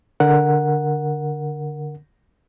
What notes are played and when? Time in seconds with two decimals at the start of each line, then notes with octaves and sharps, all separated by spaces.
0.20 D3 A#4 F#5